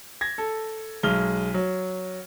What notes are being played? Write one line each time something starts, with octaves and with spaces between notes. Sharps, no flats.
G#6 A#6
A4
B1 G#3 F6 G7
F#3